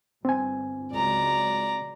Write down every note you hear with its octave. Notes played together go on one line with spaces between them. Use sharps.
G1 C4 G#5
C#2 F#3 G#3 D5 A#5